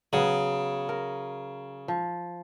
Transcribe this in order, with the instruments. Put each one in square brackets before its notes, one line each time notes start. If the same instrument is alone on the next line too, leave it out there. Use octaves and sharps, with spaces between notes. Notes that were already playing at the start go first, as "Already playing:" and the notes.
[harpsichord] C#3 [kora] F#3 B3
[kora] A#4
F3